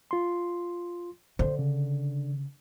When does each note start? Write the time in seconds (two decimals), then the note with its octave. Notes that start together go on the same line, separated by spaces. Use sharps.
0.11 F4 C6
1.39 D3 C5
1.59 C#3